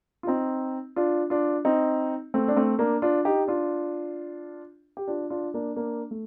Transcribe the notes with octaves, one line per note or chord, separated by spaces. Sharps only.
F4
C4 D#4
D4 F4
D4 F4
C4 D#4
A3 C4
D4
A3 C4
A#3 D4
D4 F4
D#4 G4
D4 F4
G4
D4 F4
D4 F4
A#3 D4
A#3 D4
A3